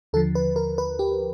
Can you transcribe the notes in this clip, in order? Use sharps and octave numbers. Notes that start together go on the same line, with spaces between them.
D#2 D3 F3 A4
B4
A#4
B4
G4